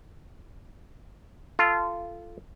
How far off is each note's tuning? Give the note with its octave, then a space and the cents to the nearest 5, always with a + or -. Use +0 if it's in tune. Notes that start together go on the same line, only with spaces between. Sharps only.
F4 -15 A4 +0